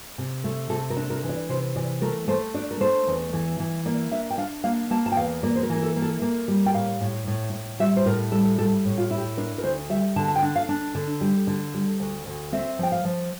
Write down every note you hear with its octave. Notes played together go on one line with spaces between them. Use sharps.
C3
A3
C3 A4
A#4
D4
A#4
E3
D5
C3 C5
E3 D5
A3 A#4
A3 C5
D4 D5
A#4
A3 C5
E2
E3
E3
A#3 D5
D4 E5
G5
D4 F5
A#3 F5
A#3 A5
A5
G5
E2 F5
A#3 D5
C5
A#4
E3
A#4
A4
A#3
A4
A#3
G3
G5
A2 F5
A2
A2
A2
G3 E5
C5
A2 A#4
G3 A4
G3 A4
A2
F4
E4
G4
D4 A#4
A#4
D2 C5
G3 E5
D3 A5
A5
G5
D4
F5
D4
D3
G3
D3
G3
D2
D2
C4 E5
F3 G5
F5
F3